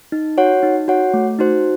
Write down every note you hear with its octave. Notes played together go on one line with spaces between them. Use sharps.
D#4
F#4 C#5 F#5
D#4
F#4 C#5 F#5
A3
D#4 F#4 C5